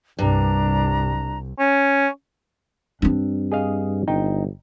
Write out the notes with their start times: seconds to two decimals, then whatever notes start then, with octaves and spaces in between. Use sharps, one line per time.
0.19 C2 G2 D4 A#5
1.59 C#4
3.02 G2 C4 D4
3.52 G#4 D#5 F5
4.08 G1 D#4 G5